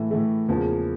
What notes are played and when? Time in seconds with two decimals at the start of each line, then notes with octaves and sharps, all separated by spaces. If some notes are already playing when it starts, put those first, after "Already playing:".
Already playing: A2 E3 A3
0.11 A2 E3 A3
0.48 E2 C#3 F3 A#3